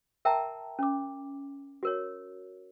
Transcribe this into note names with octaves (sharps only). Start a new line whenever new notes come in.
A#4 E5 G5 A5 A#5
C#4 D6
F#4 A#4 C#5